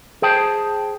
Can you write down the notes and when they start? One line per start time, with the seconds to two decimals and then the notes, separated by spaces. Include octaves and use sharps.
0.22 G#4 C5 G5 A5